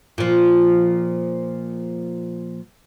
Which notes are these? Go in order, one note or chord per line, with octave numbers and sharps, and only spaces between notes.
A#2 F3